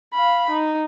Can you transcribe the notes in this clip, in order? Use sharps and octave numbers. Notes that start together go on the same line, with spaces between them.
F5 B5
D#4